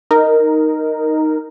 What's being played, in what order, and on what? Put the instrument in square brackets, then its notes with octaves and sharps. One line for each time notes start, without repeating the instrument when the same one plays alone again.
[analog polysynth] D#4 A#4